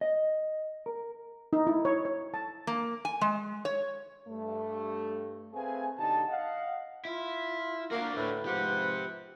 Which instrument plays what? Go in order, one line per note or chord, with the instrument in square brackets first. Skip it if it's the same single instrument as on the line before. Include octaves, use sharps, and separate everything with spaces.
[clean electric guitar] D#5
A#4
[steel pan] D#4
E4
C#5
C#5
A5
[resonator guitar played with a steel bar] A#3
G#5
G#3
C#5
[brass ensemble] G2 A3
A3 C4 G#4 B4 F5 G#5
B1 D3 D#4 G4 A5
D#5 F5 F#5
[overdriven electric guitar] E4 [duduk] F4
[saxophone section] A#3 [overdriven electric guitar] D4 F#4
[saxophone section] D2 A2 [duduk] B4
[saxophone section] G#2 F3 F#5 [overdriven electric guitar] G4 C5